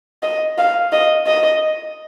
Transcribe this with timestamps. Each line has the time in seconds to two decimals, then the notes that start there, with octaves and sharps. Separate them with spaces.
0.23 D#5
0.58 F5
0.92 D#5
1.27 D#5